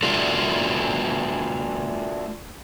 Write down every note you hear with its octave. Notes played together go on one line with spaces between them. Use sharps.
A3 D4 F4 F#4 A4